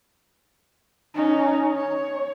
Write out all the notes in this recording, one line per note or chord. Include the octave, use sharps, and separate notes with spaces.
C#4 D#4
C#5